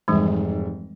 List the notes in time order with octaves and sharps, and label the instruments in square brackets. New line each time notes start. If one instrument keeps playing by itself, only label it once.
[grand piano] F1 G#2 [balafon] E3 G3 G#3